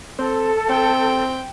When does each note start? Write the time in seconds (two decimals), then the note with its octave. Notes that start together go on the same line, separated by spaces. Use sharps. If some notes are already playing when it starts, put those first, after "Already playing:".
0.19 C4 A4
0.70 C4 G5